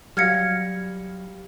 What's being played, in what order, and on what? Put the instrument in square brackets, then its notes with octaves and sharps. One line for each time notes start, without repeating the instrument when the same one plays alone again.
[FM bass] F#3 [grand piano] G3 F5 A#6 [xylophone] F6 G#6 C#7